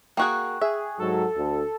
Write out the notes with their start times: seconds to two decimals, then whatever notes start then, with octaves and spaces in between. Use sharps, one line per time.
0.17 A#3 F#4 G#4 G5 C#6 F#6
0.61 G#4 E5
1.00 G#2 F#3 A4
1.37 D2